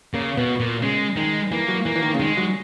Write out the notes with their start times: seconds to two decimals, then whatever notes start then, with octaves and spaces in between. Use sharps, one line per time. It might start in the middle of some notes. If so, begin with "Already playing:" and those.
0.14 C#3 A#3
0.37 B2 B3
0.60 A#2
0.82 C#3 G#3
1.16 D#3 G#3
1.51 E3 A#3
1.68 F#3
1.85 E3 A#3
1.96 E3
2.03 D#3
2.14 C#3
2.19 D#3 G#3
2.37 F#3